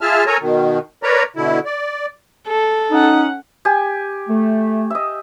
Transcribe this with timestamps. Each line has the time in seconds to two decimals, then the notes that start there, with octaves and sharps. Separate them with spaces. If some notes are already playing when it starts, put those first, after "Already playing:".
0.01 F4 G#4 E5 A5 F6
0.27 A4 A#4 C#5 G#5 A#5
0.41 B2 D#3
1.03 A#4 B4 C#5 D5 A#5
1.36 B2 D3 E4
1.65 D5
2.48 A4
2.91 C#4 D#4 F#5
3.65 G4 G#5
4.28 A3
4.90 D#5 E5